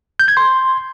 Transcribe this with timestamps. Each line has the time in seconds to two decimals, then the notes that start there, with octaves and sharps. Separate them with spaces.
0.20 G6
0.28 G#6
0.37 C6